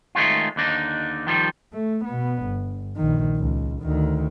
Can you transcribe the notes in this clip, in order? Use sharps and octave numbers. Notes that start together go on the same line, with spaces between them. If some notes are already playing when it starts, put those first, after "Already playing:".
D#3 G#3 A3 C#4 F4
D#2 D3 D4 D#4
D#3 F3 G3
A3
B2 B3
G1
A#1 D#3
C#2
D2 D#3